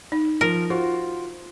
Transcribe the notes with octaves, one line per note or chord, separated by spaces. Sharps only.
D#4
F3 A#4
F4 F#4 C5